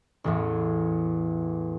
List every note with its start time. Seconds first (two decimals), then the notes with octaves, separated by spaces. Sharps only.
0.24 A1 E2 A2